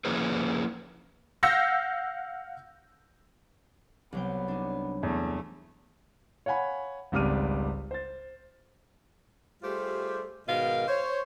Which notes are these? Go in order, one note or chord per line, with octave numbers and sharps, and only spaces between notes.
F3 A#3 C#4 E4 G#4 B4
F5 F#5 E6 G6 A#6 C#7
C2 F#3 B3 G5
D4 D#4
E2 A3
C#5 F5 F#5 G#5 B5
G#1 C#2 G3 D6 F6 D#7
C5 A6
G3 A3 F4 G4 G#4 C5
G#2 B2 D#3 A#4 D#5 F5
C5 C#5